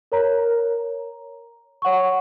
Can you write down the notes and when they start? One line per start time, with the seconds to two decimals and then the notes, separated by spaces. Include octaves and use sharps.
0.12 A#4 C#5 A#5
1.82 C#5 F#5 C#6